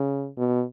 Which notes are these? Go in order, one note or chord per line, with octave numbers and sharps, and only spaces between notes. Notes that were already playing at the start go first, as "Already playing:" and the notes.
Already playing: C#3
B2